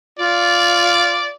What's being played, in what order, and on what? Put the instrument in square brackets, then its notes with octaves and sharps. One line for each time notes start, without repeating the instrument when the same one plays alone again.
[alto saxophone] F4 [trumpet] D5